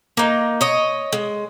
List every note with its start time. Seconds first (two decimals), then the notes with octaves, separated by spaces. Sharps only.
0.17 A#3 D#4
0.61 C#5 D#5
1.13 G#3